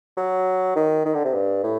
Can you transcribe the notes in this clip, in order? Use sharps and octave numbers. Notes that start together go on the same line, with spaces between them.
F#3
D#3
D#3
D3
C3
G2
A2